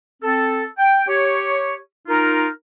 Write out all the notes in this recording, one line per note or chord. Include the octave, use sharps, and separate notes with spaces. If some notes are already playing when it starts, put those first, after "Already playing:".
C4 A4
G5
G4 C#5
D#4 F4 A#4